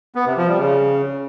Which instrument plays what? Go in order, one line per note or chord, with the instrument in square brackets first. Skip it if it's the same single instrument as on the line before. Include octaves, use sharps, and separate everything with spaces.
[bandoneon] B3
C3
F3
G3
C#3